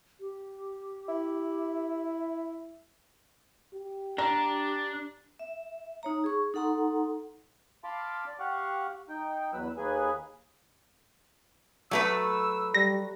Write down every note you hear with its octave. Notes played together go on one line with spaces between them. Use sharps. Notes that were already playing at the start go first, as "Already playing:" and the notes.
G4
E4
G4
D4 A#5
E5
D#4 C#5 A#5
G#4 C#6
D#4 A4 F#5 A#5 C6
F5 A5 B5 C6 D6
D5
G4 F5 F#5 C#6
D#4 G5
E2 F#3 B4 E6
D#2 A#3 G#4 B4 G#5
F#3 A3 B4 E6
G3 A#6